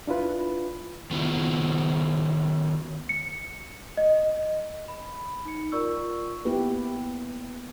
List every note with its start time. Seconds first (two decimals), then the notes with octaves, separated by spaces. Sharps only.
0.07 D4 E4 F4 B4
1.11 D#3 B3 E4 F4
3.09 C#7
3.97 D#5
4.88 B5
5.45 D#4 C#7
5.72 F4 A#4 D5 C#6 E6
6.45 A#3 B3 E4 G4 B4